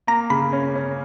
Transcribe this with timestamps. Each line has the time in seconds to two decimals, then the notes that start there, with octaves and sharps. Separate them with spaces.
0.07 A#3 A#5
0.30 C#3 B5
0.53 C#4
0.75 C#4